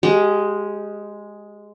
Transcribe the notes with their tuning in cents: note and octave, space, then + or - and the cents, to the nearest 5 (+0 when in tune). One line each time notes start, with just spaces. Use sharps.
G#3 +0 G4 -25